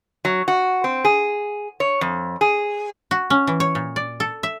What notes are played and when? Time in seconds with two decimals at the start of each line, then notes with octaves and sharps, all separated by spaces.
0.25 F#3
0.48 F#4
0.84 C4
1.05 G#4
1.80 C#5
2.01 F2
2.41 G#4
3.11 F#4
3.30 C#4
3.47 E3
3.60 C#5
3.75 A#2
3.96 D5
4.20 A4
4.43 E5